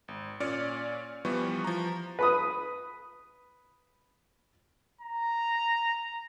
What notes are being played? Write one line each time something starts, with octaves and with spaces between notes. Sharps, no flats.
G#1
A#2 C#4 D5 F6 C#7
E3 F3 G3 B3 C#6
F3 A#5
B4 B5 D#6
A#5